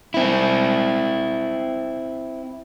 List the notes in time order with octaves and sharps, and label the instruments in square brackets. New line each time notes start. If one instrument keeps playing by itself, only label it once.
[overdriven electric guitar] C4 E4